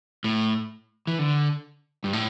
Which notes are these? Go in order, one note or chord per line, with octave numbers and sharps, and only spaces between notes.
A2
E3
D3
G2
A2